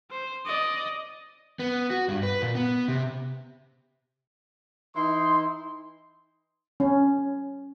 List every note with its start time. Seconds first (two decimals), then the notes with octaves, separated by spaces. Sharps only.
0.10 C5
0.46 D5 D#5
1.59 B3
1.91 F#4
2.08 G2
2.23 B4
2.42 A#2
2.55 B3
2.88 C3
4.95 E3 D#4 E4 C6
6.80 C#4